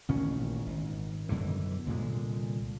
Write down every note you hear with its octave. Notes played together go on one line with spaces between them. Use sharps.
A1 A#2 D#3 C#4
G#1
F#2 B2 D3 E3
C2 A#2 D3 G#3